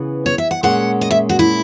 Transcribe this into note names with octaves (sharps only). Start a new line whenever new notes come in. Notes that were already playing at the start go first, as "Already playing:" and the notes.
Already playing: C#3 E3 B3
C#5
E5
F#5
A#2 G#3 C#4 F#5
D#5
E5
F#4
E4